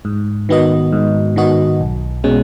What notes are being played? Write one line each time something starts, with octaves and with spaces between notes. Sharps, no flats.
G#2
D#3 B3 F#4 D#5
G#2
D#3 B3 F#4 D#5
B1
B2 G#3 C#4